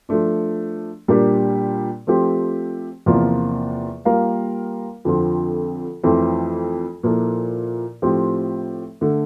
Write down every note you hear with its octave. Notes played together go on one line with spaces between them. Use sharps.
F3 A3 D4
A#2 G3 D4 G4 A#4
F3 A3 C4 G4
E2 C3 F3 A#3 F4
G3 A#3 F4 A#4 F5
F2 D3 F3 C4
F2 E3 A3 C4
A#2 F3 A#3 E4 A4
A2 F3 C4 G4
D3 A3